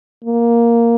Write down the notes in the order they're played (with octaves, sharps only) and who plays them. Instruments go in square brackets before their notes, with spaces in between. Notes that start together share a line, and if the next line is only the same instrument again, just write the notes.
[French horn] A#3